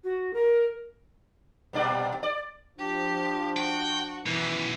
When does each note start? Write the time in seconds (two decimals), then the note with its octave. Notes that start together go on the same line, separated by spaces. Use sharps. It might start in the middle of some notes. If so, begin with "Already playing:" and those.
0.04 F#4
0.34 A#4
1.73 G2 A#2 D5
2.23 D5
2.79 F3 D4 G4
3.57 F#4 G5
4.26 F#2 B2 E3 E5